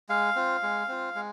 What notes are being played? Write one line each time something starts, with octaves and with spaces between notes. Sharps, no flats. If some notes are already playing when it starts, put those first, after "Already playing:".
G#3 F5
C4 F4
G#3
C4 F4
G#3